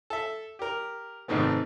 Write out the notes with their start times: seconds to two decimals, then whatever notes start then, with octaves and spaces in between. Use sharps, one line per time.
0.10 A4 E5
0.59 G4 A#4
1.28 G#1 G#2 C3 D#3 A3 B3